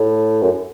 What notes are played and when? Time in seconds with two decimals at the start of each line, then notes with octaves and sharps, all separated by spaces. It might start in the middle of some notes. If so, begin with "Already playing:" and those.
Already playing: A2
0.42 F#2